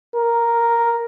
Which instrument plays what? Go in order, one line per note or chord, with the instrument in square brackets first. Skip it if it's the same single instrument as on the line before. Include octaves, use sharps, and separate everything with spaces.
[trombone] A#4